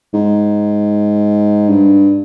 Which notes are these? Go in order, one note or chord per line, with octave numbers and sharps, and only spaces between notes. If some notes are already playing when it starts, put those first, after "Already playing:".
G#2
G2